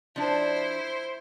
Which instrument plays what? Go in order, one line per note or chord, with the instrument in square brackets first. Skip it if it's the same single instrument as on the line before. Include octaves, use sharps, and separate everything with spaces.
[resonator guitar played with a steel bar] F3 D4 [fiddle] E4 C5